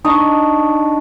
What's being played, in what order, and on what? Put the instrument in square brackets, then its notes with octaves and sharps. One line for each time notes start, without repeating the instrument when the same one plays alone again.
[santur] D4 D#4 D#5 C#6